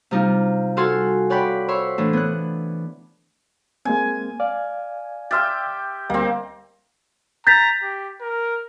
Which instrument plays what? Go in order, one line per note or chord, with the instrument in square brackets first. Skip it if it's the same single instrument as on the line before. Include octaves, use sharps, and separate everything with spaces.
[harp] C3 G3 D#4 F4
F#4 A4 F5 F#5 G#5 C6
C#5 D5 F#5 G5 B5
C5 C#5 E5 B5 C6
A2 E3 D4
B3 F#6
[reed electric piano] G#3 A#3 C4 [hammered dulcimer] G#5
[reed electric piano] D5 F5
[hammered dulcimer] G4 E5 G5 [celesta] C6 F6 A6
[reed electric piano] D2 G3 D#5 [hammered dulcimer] A#3 C4
[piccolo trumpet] A#5 [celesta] G6 A6 B6
[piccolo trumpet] G4
A#4